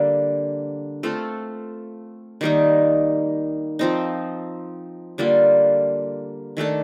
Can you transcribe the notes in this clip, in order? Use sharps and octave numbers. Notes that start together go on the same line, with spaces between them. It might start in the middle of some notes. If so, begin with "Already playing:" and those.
Already playing: D3 G3 A#3
A3 C4 F4 A4
D#3 G3 A#3 D#4
F3 C4 D#4
D3 G3 A#3 F4
D#3 A3 D4 A4